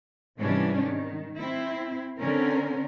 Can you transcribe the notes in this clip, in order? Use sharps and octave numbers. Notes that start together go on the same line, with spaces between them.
G#2 C3 E3 G3 C#4 D4
D#3
C4 E4
D3 C4 C#4 A#4